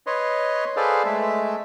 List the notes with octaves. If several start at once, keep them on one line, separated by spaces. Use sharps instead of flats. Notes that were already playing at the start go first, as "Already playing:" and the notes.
B4 C#5 D#5 C6
G#4 A4 B4 C5 D5 F5
G#3 A3 E5